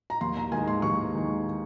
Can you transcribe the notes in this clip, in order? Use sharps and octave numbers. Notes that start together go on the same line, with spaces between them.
A#5
D#2 C6
A#5
D#3 G#3 G#5
C6
D#2 C#6
D#3 G#3